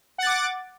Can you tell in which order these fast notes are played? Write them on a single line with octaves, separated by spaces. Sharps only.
F#5 A6 D6